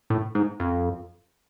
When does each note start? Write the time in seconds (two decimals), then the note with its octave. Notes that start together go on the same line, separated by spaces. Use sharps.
0.10 A2
0.35 G#2
0.60 F2